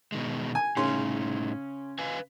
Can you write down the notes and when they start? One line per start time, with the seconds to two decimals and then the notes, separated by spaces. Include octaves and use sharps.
0.12 B2 D#3 G#3
0.55 G#5
0.77 A2 C#3 C#4 D#4 C6
1.99 B4 F5 G#5